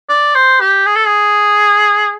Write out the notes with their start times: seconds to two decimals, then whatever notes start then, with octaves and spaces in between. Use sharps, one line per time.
0.09 D5
0.35 C5
0.61 G4
0.86 G#4
0.96 A4
1.07 G#4